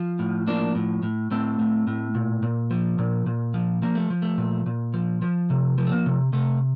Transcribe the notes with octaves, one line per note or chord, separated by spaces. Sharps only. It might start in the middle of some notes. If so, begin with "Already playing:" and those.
Already playing: F3
A2
F3 A#3 D4
A2
A2
A2 A3 C4
A2
A2
A#2
A#2
F3
A#2
A#2
F3
F3 A#3
A3
F3
A3
A#2
A#2
F3
F3
C3
F3
A3
A#3
C3
C3 A3